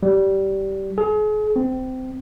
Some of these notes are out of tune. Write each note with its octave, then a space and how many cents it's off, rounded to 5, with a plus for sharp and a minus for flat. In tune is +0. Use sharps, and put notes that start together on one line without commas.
G3 -20
G#4 +40
C4 -20